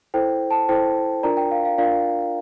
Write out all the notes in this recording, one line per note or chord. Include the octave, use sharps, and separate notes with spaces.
E4 A4 C5 G5
A5
E4 A4 C5 G5
D4 F4 A#4 D5 A#5
G5
F5
F5
D4 F4 A#4 D5 F5